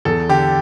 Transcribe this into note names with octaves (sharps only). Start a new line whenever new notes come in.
E2 A4
D3 G4